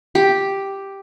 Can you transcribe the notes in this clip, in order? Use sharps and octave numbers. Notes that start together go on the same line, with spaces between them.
G4